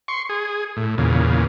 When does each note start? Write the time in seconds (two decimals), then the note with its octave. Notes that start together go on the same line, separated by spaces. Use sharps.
0.08 C6 C#6
0.29 G#4
0.77 A2
0.98 E2 A#2 C#3